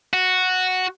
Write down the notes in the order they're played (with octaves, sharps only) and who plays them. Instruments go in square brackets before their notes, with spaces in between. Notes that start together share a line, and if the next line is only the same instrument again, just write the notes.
[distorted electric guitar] F#4